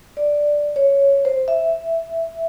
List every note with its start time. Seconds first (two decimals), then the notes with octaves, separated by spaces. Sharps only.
0.17 D5
0.76 C#5
1.25 C5
1.48 E5